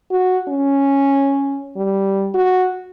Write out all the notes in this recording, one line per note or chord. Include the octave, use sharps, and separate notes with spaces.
F#4
C#4
G3
F#4